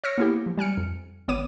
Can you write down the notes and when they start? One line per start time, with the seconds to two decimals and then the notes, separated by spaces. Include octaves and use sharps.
0.04 C#5 E6 F6 A#6 C#7
0.18 A#3 B3 E4 G4
0.46 F3
0.57 G3 G#5 F6 C#7
0.77 F2
1.28 G#1 B3 C#5 D6 D#7